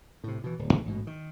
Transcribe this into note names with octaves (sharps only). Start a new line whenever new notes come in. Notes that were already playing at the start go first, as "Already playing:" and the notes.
A2 C3
B2 E3
D1
C#2 C#3 E3
A1 G#2 B2
D#3